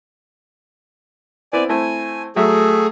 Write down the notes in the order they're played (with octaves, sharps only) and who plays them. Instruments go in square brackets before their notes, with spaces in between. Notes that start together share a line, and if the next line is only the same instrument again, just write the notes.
[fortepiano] B3 C4 E4 [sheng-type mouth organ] D5 G#5
[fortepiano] A3 C4 E4 [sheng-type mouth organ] G#5
[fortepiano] F#3 E5 [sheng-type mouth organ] A3 G#4